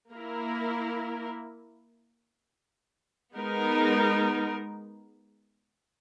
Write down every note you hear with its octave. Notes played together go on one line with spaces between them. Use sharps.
A#3 E4 A#4
G#3 B3 D#4 A#4